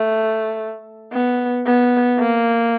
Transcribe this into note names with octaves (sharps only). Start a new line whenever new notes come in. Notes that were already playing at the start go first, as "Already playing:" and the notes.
Already playing: A3
B3
B3
A#3